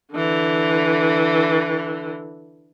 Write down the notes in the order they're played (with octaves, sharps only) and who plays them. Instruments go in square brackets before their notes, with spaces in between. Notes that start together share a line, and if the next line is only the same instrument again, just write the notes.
[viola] D3 E3